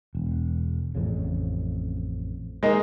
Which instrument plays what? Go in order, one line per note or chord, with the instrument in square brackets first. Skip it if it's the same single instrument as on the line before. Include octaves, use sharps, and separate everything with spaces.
[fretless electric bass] E1
A1 F2 C#3
[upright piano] G#3 A#3 D#4